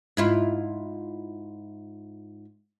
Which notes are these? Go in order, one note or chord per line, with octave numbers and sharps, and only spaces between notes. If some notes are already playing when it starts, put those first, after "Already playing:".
G#2 E4 F4